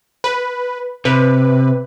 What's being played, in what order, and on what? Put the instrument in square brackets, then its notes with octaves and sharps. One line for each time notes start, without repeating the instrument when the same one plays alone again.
[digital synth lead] B4
[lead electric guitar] C3 [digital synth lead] B4